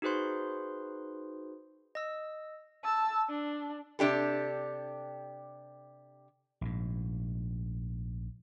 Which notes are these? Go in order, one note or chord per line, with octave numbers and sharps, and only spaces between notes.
D#4 F#4 G#4 B4 C5 C6
D#5 E6
A5 E6
D4
C3 D4 G4 A4
A#1 G#2